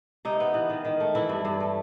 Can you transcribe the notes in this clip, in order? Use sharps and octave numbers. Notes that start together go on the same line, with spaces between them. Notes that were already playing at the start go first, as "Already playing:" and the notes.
C3 D#4
B3
E3
D#3
D#3
A3
E3 E4
G2
G2
A3